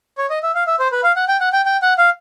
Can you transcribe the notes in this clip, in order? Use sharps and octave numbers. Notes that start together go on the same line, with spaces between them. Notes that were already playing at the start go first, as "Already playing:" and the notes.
C#5
D#5
E5
F5
E5
C5
B4
F5
F#5
G5
F#5
G5
G5
F#5
F5